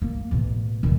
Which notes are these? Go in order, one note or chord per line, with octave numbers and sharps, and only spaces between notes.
A#3
A1 B2
A#1 D#2